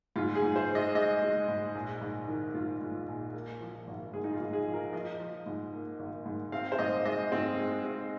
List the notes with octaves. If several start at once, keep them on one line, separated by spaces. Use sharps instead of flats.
G#2 F4
G#4
G#2
C5
G#3
D#5
G#3 D#5
G#3
G#2
A#1
G#2
D#3
G#2 F4
G#2
A#1
A#3
F3
G#1
G#2 G#4
D#4
F4
G#2
G#4
F3
A#4
F3 D#5
F3
G#2
A#3
G#1
G#2
C4 F5
C5
G#2 D#5
G#3 D#5
G#2 C4
G#3
C4